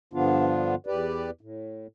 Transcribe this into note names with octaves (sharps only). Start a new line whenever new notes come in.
G2 D3 F3 B3 D4 F4
E2 G4 B4 D5
A2